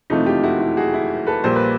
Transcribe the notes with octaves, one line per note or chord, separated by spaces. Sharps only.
F#1 F2 C3 E3 A3 D#4 F4
F4 G4
E4 F#4
E4
F#4 G#4
E4
A4 B4
A#1 A#2 G3 A#3 C5
B4